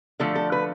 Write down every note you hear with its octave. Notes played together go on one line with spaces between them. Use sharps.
D3 F3 A3 A4
A4
B4